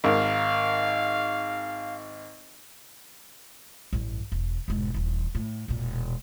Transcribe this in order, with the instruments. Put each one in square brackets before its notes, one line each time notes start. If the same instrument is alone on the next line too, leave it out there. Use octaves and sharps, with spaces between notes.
[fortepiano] G#1 A#4 [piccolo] F5
[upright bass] A1 G2
E1
E1 G#2
D#1 E3
A2
E1 A#2